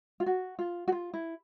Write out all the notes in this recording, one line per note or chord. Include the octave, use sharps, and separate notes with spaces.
F4
F#4
F4
F#4
F4
E4